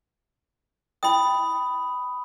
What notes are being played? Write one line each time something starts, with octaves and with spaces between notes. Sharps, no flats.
E4 D#5 G5 B5 D#6